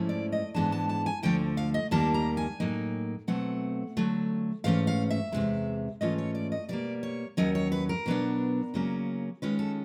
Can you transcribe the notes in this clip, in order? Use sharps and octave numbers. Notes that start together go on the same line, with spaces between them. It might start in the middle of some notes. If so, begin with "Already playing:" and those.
Already playing: G#2 F3 A3 C#4 E4
D5
D#5
G#2 E3 G#3 B3 D4 A5
A5
A5
G#5
D2 D3 F3 A3 G5
F5
D#5
D#2 D#3 G3 A#3 A5
A#5
G#5
A2 F#3 A#3 D#4
B2 F#3 A3 C4 F#5
D3 F#3 A3
G#2 E3 A3 C#4 F5
F5
E5
E2 C3 D#3 G#3
G#2 E3 A3 C#4 F4 D#5
C#5
D5
D#5
B2 G3 A#3 D5
C#5
D#2 D#3 F#3 C#4 D#5
C#5
B4
A#4
B2 F#3 B3 D4
C#3 F#3 A#3 C#4
D#3 G#3 C#4 F4 B4
A4